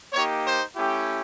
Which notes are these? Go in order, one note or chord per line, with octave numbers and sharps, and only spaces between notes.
A#3 D#4 G4 C#5
C5
A3 C#4 E4 G4